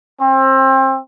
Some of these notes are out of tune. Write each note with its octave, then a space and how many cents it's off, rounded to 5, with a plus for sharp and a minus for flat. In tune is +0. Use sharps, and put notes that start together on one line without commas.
C4 +30